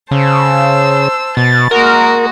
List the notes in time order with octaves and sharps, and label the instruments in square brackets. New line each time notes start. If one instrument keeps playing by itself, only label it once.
[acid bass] C#3 [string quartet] C5 A5 E6
[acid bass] B2 [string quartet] A6
[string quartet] G#3 A#3 F#4 [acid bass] A#4